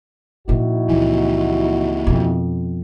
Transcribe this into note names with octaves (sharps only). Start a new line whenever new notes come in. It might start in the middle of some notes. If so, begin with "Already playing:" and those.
A#2 D#3 F3 E4 F#4
C#2 E3
F2 B2